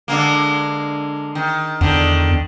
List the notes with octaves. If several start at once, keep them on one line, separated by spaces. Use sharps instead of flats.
D3 G#3 A#3
D#3
E2 D3 D#3